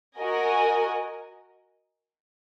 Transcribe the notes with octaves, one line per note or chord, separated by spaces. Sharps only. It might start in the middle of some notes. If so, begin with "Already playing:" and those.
F#4 A#4 D#5 G#5